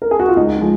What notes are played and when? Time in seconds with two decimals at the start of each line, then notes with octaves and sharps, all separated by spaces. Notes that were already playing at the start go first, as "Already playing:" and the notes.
0.02 A#4
0.11 G#4
0.19 F#4
0.28 F4
0.36 C#2 D#4
0.61 F3 G#3